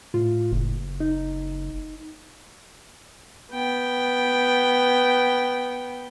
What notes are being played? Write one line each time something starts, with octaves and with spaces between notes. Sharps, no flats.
A2 F4
F#1
D#4
B3 G5